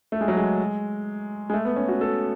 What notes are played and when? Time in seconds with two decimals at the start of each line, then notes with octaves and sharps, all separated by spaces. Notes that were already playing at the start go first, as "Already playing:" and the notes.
0.12 A3
0.21 G#3
0.28 F#3
0.37 G#3
1.50 G#3
1.54 A3
1.65 B3
1.76 C#4
1.88 F#4
2.01 A4